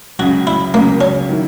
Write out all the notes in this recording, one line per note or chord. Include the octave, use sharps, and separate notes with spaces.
C#2 C#3 F#3 F#4
E4
C#2 C#3 F#3 A#3
C#4
D#3 F#3 A#3 E4